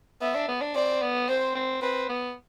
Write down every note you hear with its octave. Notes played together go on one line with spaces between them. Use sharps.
B3 E5
D4
B3
D4
C4 D5
B3
C4 C5
C4
C4 B4
B3